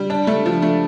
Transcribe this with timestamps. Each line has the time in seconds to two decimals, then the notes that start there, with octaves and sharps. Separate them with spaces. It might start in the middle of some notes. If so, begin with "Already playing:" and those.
Already playing: G3
0.10 D4
0.27 A3
0.46 F3
0.62 A3